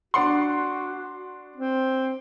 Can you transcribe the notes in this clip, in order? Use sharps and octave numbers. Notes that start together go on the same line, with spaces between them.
D4 F#4 F#5 C6
C4